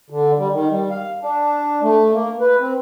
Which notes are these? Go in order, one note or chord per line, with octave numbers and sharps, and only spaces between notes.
D3
G3
D#3
G3
F5
D4
A3
A#3
B4
C4